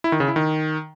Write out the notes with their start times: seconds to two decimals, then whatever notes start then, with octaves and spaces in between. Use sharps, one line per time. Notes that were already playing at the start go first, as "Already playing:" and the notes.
0.04 E4
0.12 D#3
0.20 C#3
0.28 E4
0.36 D#3